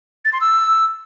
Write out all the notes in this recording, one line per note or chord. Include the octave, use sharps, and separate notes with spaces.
A6
C6
E6